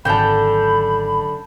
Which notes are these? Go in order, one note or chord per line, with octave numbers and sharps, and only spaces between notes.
G#1 F#2 D3 G5 A5 B5 G6